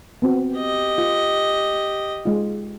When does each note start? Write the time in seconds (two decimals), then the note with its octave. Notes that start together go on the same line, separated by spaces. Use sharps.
0.22 B3 C4 F#4
0.57 G4 D#5
0.98 F4
2.25 G#3 F4